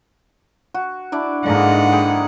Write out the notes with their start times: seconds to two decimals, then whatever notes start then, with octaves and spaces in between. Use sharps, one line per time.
0.74 F#4
1.12 D4 E4 D5
1.46 G#2 D3 G#3 A#3 F#5
1.93 G#4 G5